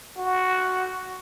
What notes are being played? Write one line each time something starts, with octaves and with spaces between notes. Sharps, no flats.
F#4